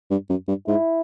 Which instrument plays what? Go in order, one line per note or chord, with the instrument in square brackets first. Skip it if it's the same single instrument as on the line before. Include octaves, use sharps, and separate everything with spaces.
[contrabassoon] G2
F#2
G2
[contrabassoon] G#2 [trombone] E4